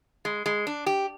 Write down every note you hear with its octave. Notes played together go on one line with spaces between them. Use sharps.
G#3
G#3
D4
G4